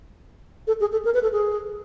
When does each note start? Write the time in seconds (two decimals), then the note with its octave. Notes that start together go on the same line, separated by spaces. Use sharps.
0.67 A4
0.81 G#4
0.92 A4
1.05 A#4
1.14 B4
1.23 A4
1.33 G#4